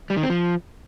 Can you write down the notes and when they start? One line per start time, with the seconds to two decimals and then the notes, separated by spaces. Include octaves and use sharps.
0.10 G3
0.17 D#3
0.23 C4
0.30 F3